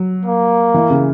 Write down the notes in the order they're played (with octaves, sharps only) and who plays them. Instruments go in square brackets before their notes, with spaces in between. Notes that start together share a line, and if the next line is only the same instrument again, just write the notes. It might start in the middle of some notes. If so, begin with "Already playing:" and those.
Already playing: [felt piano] F#3
[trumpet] A#3
[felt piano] E3
C#3